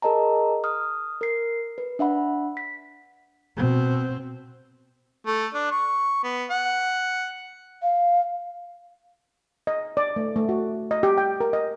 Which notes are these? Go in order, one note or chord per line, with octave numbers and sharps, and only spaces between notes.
G#4 A#4 D#5 A5 A#5
D#6 F6
A#4 C7
B4
D4 E5 F#5 B5
B6
B2 C4
A3
D4
C#6
B3
F#5
F5
D#5
D5
A3
A3
F#4
D#5
G4
G5
A#4
D#5